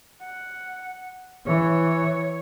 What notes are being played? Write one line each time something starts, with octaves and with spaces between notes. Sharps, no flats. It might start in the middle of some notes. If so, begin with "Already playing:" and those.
F#5
E3 C#5